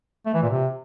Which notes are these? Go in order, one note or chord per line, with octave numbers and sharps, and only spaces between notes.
A3
E3
A#2
C3